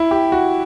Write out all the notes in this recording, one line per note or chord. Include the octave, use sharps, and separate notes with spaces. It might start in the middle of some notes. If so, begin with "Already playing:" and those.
Already playing: E4
G4
F#4